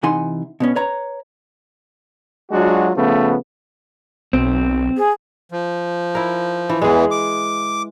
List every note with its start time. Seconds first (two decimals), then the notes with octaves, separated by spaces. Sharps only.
0.03 C3 E3 D#4 F#5 G#5 C6
0.60 B2 B3 C#4
0.76 B4 C#5 A#5
2.52 F#3 G#3 D4 F4 F#4
2.95 C#3 F3 A3 B3
4.33 B1 C4
4.97 G#4
5.52 F3
6.15 E4 A#4
6.69 E3
6.81 E2 E3 G#3 G#4
7.11 D6